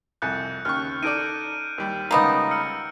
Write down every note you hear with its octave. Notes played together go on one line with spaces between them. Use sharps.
C2 F2 G#5 F#6 G6 C#7
D#2 C#3 C#6 F6
D#4 A4 D5 G6 D7 D#7
D#2 G3
C#2 G3 A#3 B3 D#4
E6 F6 C#7